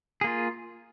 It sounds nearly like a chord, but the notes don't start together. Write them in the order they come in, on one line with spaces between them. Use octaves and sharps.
G#4 A#3 F4